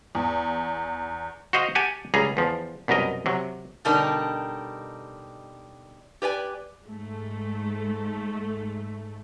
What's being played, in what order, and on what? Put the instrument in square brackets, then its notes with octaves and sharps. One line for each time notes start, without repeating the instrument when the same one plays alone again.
[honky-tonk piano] E2
[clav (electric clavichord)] F#4 C5 D#5 F5
G4 F#5 G#5 A5
C#2 G3 G#4 A#5
E2 F3
C2 F#2 B2 A#4 D#5
C3 F#3
[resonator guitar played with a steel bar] B2 D3 G3 D4 D#4 A#4
G4 B4 D5 G#5
[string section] G#2 A3